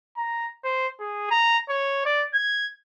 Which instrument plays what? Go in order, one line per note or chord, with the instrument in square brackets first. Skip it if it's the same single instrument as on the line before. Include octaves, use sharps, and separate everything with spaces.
[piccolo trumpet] A#5
C5
G#4
A#5
C#5
D5
G#6